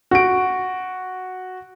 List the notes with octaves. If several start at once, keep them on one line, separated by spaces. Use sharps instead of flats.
F#4 D7